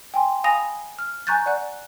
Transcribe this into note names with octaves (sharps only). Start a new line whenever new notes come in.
G5 G#5 C6
F5 G#5 B5 D#6 A#6 F7
F6
G#5 A#5 C#6 F#6 G6 A6
D5 F#5 F#6